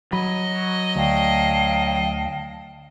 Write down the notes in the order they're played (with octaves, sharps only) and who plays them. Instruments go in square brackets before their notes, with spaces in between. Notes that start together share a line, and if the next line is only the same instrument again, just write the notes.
[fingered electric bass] F#3 [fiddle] D#5 [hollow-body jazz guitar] B5
[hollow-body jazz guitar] D2 [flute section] F5 G5 A5